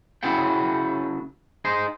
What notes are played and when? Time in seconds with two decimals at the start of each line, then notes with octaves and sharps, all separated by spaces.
0.23 C#3 C#4 E4 F#4 F#5 G5
1.65 D#4 G#4 C5